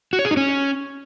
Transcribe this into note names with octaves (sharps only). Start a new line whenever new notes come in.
F#4
C#5
G#4
D#4
C#4